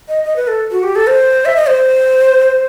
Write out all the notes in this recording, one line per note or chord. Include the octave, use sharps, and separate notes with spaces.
D#5
D#5
B4
A4
F#4
G4
A4
C5
E5
D#5
C5